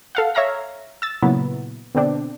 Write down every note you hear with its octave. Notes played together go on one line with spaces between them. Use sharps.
A4 F5 F#5
C#5 E5 F5 A#5 F6 A#6
E6 A6
A#2 C#3 F#3 B3 E4
B2 D3 C4 D4